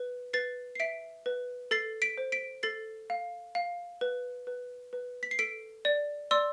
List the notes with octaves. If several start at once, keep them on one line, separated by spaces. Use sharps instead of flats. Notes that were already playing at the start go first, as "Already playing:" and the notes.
Already playing: B4
B4 A6 C7
C7
E5 B6 D7
B4
A4 A6 C7
B6 D7
C5
B6 D7
A4 A6 C7
F5
F5
B4
B4
B4
B6
C7
A4 B6 D7
D5
D5 C6 E6